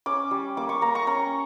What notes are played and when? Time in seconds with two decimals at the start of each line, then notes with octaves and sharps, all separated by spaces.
0.06 C#4 D6
0.31 G3
0.57 A#3 D6
0.69 C#6
0.81 A#3 A#5
0.95 C#6
1.07 C#4 A#5